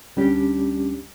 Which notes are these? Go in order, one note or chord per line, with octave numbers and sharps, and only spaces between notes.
D2 G3 C#4 D4 G4